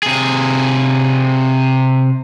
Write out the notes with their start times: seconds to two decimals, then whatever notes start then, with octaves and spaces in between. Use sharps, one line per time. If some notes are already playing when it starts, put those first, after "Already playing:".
0.03 C3 G#4